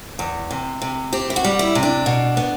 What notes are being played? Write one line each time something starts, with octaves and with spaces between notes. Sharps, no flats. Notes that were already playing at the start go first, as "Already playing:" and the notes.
E2
C3
C3
C4 G4
E4
F#4
G3
E4
C3
D4
B2
B3